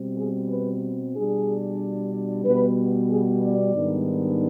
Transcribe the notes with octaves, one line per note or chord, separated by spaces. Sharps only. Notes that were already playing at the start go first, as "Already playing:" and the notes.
Already playing: B2 G3 C4
G#4
B4
B2 G3 D4 G#4
B2 G3 B3 B4
G#4
D5
G#2 D#3 G3 B3 D4